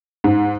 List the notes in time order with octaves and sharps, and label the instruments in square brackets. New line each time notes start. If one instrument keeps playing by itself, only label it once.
[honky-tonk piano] G#2